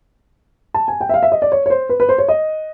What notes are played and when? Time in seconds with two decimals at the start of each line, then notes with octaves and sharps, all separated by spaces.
0.74 A5
0.88 G#5
1.01 G5
1.09 E5
1.14 F5
1.23 E5
1.32 D#5
1.42 D5
1.52 C#5
1.66 C#5
1.70 C5
1.89 B4
2.00 B4
2.09 C5
2.18 C#5
2.28 D#5